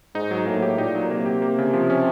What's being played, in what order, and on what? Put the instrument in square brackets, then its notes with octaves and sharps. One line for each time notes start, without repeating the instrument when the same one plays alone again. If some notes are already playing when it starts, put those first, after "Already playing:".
[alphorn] G#2 [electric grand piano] D#4
[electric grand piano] F#3
[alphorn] A2 [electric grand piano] A#3
[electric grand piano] G4
[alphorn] A#2 [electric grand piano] D#4
[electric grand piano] F#3
[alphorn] C3 [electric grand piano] A#3
[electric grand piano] G4
A#3
C#3
F3
C#4